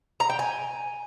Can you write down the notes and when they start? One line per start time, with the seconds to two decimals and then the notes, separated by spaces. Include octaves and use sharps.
0.20 A#5
0.30 G5
0.39 G#5